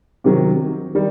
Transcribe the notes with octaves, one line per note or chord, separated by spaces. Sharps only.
C3 D#3 F#3
D#3 G3